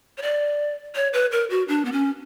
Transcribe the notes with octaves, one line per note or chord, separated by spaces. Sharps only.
C#5
D5
C#5
B4
A#4
F#4
D4
B3
C#4